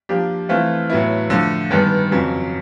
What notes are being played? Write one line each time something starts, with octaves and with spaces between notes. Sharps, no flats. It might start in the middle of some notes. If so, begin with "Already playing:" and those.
F3 A#3 D4 G4
E3 A3 C4 F4
A2 F#3 B3 E4
D3 F3 A3
G2 D#3 G#3 B3
F2 C#3 F#3